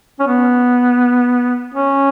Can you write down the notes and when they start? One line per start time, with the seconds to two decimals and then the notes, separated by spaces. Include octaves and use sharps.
0.20 C#4
0.28 B3
1.74 C#4